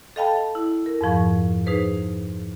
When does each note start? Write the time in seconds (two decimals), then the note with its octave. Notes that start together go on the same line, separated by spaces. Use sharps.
0.16 A4 D#5 F5 G5 A5 B5
0.55 E4
0.86 A#4
1.01 F2 G#2 F3 C#6
1.66 D#4 G#4 B4 C5